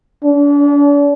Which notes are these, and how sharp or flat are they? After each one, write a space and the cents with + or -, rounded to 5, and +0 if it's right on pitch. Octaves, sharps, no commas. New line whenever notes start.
D4 -40